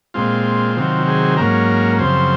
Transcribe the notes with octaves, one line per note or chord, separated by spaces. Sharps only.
A#2 G#3 C4 F4
C3 D#3 F#3 C4
G#4
G#2 F#3 A#3 C#4 A#4
F#2 C#3 F3 C4 C5